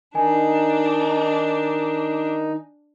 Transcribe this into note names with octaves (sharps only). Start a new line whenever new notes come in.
D#3 D4 D#4 G#5